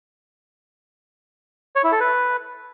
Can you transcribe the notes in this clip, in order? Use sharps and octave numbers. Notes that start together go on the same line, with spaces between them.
C#5
E4
A4
B4